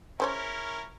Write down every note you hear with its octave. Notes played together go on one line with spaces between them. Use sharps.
C#3 C#4 E4 A#4 C5 C#5